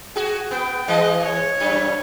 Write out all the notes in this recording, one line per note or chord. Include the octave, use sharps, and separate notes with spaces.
F#4 G#4
B3 G5
E3 G#3 D#5
C#5
F#2